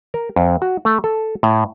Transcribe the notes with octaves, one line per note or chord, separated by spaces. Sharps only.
A#4
F2
F#4
A3
A4
A2